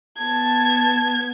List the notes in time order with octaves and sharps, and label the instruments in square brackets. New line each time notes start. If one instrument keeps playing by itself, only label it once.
[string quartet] B3 G#6 [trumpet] A5